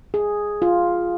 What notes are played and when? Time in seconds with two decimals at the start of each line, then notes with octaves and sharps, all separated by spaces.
0.14 G#4
0.62 F4